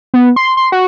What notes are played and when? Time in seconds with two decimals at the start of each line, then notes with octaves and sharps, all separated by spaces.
0.14 B3
0.36 C6
0.57 C6
0.72 F#4